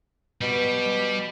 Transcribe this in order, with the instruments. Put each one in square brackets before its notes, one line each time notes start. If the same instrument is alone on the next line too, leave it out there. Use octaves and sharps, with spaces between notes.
[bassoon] B2 [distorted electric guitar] G3